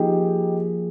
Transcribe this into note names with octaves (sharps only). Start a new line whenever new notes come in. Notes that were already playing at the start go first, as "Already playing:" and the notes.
Already playing: F3 A#3 D#4 F4 G4 G#4